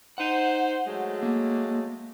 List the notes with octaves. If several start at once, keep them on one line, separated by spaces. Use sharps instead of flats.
D#4 C5 F#5
F#3 G#3 A3
A#3